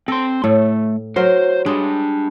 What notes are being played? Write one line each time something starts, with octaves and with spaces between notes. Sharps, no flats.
C4 A4 C6
A2 A3
F#3 A#4 C5
G#3 D4 G4